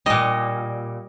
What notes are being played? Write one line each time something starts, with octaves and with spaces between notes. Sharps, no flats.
A#2 G3 D#5